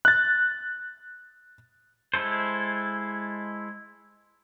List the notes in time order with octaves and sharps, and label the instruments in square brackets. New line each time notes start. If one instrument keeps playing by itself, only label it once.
[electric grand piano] F#6 A6
[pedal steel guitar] G#3 E4 A4 C5